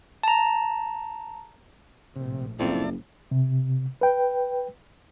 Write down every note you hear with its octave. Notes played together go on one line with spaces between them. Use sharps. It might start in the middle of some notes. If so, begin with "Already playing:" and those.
A5 A#5
A#1 A2 C3
F#1 F2 E4 D5 A5
C3
B4 G5